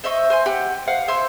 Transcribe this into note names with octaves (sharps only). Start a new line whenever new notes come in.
C5 D#5 E5 C#6
C5 G#5 C6
G4 F#5
C5 F5 F#5
C5 E5 G#5 C6